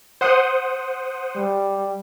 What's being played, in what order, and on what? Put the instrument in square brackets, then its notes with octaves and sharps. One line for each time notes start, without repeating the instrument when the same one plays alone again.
[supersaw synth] C5 F#5 D#6
[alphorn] G3